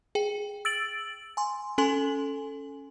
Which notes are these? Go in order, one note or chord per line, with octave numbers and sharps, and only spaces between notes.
G#4 G5
E6 A6 D7 F#7
G#5 C6
C#4 A4 G#5 C6 F#7